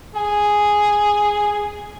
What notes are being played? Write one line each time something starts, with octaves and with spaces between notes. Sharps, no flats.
G#4 G#5